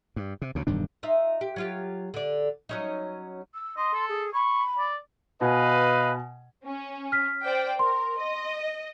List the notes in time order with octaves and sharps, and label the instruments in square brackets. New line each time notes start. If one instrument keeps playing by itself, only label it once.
[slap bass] G2
C3
D2 C#3
E1 G2 D#3 D4
[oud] D#4 F4 E5
G4
F#3 F4 G4
D3 D5
F#3 C#4 D#4
[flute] E6
[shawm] D#5 [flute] C6
[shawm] A4
[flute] G#4
[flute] B5 [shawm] C#6
[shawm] D5
[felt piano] B2 G#5 [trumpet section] B4 D#5 F5
[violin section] C#4
[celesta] F6 B6
[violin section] C5 D5 G5
[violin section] A#4 [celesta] C6
[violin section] D#5